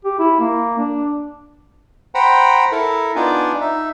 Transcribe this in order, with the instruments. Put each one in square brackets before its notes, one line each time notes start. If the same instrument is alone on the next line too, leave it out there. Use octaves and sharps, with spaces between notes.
[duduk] G4
E4
A#3
D4
[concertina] C5 F#5 G5 A#5 B5
E4 A4 A#4
B3 D4 D#4 F4 D5 G#5
D#4 E5